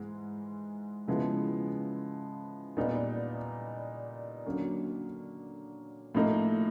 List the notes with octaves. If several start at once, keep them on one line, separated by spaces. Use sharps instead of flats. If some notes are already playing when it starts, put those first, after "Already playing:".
Already playing: G#2 E3 G#3
C#3 F3 G#3 B3 E4
A#2 G3 B3 D#4
D3 F#3 A#3 C#4
A2 F3 A#3 D#4